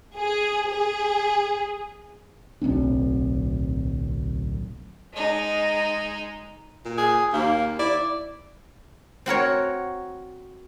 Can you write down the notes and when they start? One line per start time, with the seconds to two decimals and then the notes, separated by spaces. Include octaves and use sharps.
0.17 G#4
0.70 G#4
2.62 D1 B1 C4 D4
5.13 G#3 D#4
6.85 A#2
6.98 G#4
7.33 D#2 A#3
7.79 E4 D5
9.26 C4 F#4 A#4 C#5